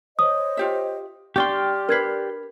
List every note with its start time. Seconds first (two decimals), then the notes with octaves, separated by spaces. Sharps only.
0.19 C5 C#5 D#5 D#6
0.57 F4 G4 E5
1.36 D4 D#4 G4 D5 G5 C6 C#6 F6
1.89 D4 A#4 B4 G#6 C7